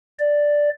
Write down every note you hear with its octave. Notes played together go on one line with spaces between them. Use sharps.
D5